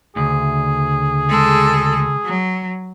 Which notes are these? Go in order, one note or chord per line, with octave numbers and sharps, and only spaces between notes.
D2 C#3 G#4
G#3 A4
F#3